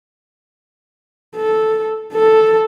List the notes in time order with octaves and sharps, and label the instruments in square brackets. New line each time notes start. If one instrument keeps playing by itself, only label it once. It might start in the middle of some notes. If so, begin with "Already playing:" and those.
[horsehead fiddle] A4
A4